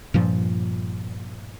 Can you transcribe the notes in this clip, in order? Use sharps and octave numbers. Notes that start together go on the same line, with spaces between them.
G2 A#2 F3